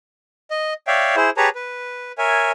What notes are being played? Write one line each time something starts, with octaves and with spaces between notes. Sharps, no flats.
D#5
C#5 D5 E5 F5 G5
E4 G#4 C5
G4 G#4 B4 C#5 A5 A#5
B4
A#4 C#5 E5 G#5